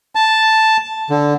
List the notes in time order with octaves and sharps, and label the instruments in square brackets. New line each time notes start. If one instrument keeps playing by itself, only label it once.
[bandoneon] A5
D3